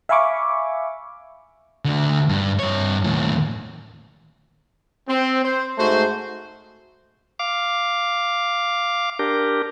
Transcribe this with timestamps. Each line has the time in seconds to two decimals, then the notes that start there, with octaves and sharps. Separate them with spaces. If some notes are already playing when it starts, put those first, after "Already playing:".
0.09 E5 F5 G#5 B5 C#6 D6
1.85 D2 D3
2.29 G2
2.59 G2 C#5
3.04 D#2 A2
5.08 C4
5.44 C5
5.78 G#2 A3 F#4 C5
7.39 F5 D6
9.19 D4 G4 A#4